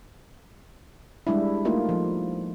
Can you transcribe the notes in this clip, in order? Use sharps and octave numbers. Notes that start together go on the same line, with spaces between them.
G3 G#3 D4 E4
A3 A#3 D#4 F4
F3